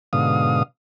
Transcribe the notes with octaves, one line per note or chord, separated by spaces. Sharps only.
G#2 B2 D3 F5 D#6